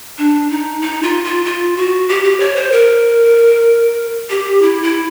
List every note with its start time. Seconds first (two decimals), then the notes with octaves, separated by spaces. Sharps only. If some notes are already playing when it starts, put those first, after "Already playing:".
0.18 D4
0.50 D#4
0.82 D#4
1.03 F4
1.24 F4
1.45 F4
1.77 F#4
2.09 G4
2.24 G4
2.40 C#5
2.56 C5
2.72 A#4
4.30 G4
4.62 E4
4.83 E4